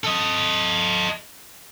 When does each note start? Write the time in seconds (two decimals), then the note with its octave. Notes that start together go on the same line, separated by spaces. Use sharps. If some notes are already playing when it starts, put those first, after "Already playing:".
0.04 A4 D#5